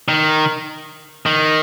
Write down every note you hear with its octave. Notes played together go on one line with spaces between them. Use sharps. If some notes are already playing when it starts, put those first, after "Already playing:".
D#3
D#3